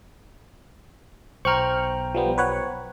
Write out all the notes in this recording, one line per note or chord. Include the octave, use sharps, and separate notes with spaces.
B1 C5 G5 A#5 C#6 F6
F3 G3 B3
B4 C#5 F#5